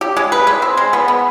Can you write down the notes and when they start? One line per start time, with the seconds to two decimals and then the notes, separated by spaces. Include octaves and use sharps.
0.01 G4
0.17 G#3
0.32 B4
0.47 G#3
0.62 C4
0.77 G#3
0.93 B3
1.08 B3